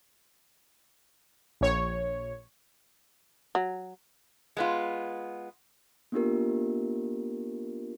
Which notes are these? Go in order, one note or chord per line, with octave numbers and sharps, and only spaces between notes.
A#1 C#5
F#3
G#3 B3 F4
A#3 B3 D4 F4 G4 A#4